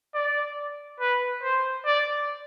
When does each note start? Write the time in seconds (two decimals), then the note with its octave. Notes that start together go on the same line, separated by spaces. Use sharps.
0.14 D5
1.00 B4
1.42 C5
1.86 D5